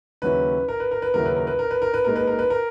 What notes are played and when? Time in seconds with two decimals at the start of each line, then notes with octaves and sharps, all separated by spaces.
0.22 D#2 C#3 F#3 C#4 E4 B4
0.68 A#4
0.80 B4
0.91 A#4
1.02 B4
1.14 D#2 C#3 F#3 C#4 E4 A#4
1.26 B4
1.36 A#4
1.47 B4
1.59 A#4
1.71 B4
1.82 A#4
1.94 B4
2.04 A#2 G#3 D#4 A#4
2.16 B4
2.27 A#4
2.39 B4
2.50 A#4